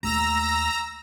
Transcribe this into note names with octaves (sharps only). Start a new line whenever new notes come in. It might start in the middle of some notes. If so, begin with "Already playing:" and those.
D#2 A3 A#5 E6 A#6